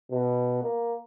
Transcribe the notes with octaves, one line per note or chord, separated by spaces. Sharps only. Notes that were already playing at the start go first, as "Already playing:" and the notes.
B2
A#3